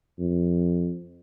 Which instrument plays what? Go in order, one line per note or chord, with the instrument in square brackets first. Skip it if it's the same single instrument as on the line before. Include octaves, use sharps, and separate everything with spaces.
[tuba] F2